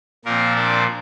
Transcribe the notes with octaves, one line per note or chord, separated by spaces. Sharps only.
A#2 F3 A#3 C4 A#4
D4 D5